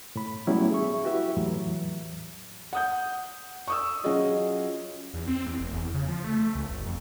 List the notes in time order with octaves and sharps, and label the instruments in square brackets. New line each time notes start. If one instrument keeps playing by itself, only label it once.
[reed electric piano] A2 B5
F#3 G3 A3 B3 C#4 E4
G#4 E5 C#6
E4 F#4 G4 B4 E5
E2 A2 E3 F#3
[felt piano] F#5 D#6 G6
C#6 D#6 E6
F#3 C#4 F4 F#4 G#4 D#5
[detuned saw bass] E2
C4
E2
F1
E2
C#3
F3
A3
A3
C#2
G1
F2